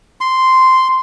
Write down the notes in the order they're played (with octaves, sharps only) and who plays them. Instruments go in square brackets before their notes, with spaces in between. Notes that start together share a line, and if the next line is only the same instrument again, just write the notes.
[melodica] C6